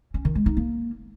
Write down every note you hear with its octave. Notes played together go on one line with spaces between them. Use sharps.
C#4
D#3
G#3
D#4
A#3